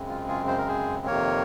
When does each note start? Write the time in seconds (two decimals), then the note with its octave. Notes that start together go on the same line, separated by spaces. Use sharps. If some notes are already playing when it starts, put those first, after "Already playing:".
Already playing: F#2 C#3 G#3 C4
0.09 F4
0.28 F4 G#4
0.48 C5
0.58 A#4
0.68 G#4 C5
1.07 F2 C3 D#3 A#3 A#4 C#5